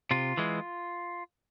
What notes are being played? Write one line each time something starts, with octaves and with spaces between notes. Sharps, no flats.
C3 F4
E3 G#3